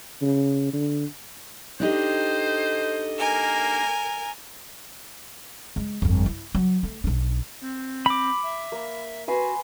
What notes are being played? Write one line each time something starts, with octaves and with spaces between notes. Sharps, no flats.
C#3
D3
D4 D#4 G4 A4 C5 D#5
A#3 A#4 G#5
G#3
G1 F2
E4
F#3
A3
B1 D4
C4
B5 D6
E5
A#3
F#4 B4 G#5 C6